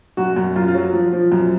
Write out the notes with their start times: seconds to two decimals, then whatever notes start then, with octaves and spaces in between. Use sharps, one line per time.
0.17 F#2 F#4
0.36 F#2
0.56 F#2 F4
0.68 F4
0.74 F#3
0.93 F3
1.13 F3
1.32 F#2